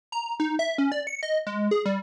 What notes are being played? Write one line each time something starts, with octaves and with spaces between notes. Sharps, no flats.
A#5
D#4
E5
C#4
D5
C#7
D#5
G#3
G#4
G3